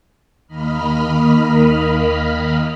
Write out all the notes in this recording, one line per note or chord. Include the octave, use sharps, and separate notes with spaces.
D#2 D#3 A#3 D#5 B5 F6